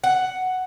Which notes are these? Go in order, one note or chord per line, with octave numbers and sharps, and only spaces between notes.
F#5